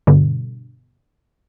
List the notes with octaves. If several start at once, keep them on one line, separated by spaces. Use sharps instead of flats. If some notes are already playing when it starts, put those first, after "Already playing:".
G2 B2 D3